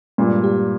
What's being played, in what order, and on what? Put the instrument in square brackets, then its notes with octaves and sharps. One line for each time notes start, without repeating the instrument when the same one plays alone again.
[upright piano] G2 A#2 [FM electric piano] G#3
[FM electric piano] G4